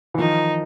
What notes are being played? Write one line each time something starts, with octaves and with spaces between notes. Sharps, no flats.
E3
D#3 F3 D#4